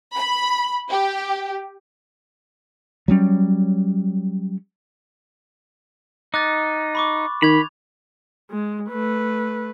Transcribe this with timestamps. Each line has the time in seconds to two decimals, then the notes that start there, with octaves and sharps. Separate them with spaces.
0.16 B5
0.91 G4
3.08 F#3 G3 C#4
6.34 D#4 D6 F#6 A6
6.95 B5 C#6 D6
7.42 D#3 B5 G#6 F7
8.51 G#3
8.90 A3 B4